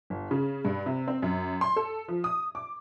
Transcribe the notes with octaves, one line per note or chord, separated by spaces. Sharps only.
G1
C#3
G2
C3
C4
F#2
C6
A4
F3
D#6
D6